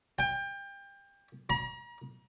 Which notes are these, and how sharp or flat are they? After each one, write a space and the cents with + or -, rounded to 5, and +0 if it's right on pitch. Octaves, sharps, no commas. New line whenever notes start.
G5 +25
A#5 +40